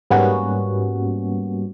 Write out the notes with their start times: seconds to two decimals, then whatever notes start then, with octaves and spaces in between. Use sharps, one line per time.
0.10 G#2 G3 A#3 B3 C#4 F#4